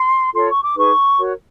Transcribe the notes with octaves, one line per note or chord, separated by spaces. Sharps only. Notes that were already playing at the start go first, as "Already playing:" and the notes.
Already playing: C6
F4 A4 C#5 C6
C#6
D6
D#4 G#4 B4 C#6
F#4 A#4 C#5